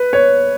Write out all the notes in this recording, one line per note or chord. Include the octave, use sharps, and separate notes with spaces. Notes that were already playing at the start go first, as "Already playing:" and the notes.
Already playing: B4
C#5